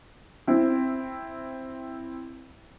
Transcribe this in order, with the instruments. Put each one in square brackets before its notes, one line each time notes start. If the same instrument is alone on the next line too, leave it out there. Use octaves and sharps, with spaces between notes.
[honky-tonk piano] C4 E4